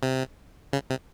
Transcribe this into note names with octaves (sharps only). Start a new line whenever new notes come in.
C3
C#3
C3